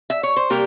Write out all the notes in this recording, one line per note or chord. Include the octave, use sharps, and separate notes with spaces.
E5
C#5
C5
C3 G3 A#3 G4 A#4